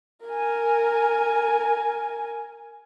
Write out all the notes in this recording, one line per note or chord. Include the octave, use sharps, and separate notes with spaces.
A#4 G#5